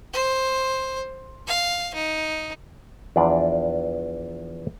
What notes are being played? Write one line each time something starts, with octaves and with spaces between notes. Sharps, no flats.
C5
F5
D#4
E2 E3 F3 D4 D5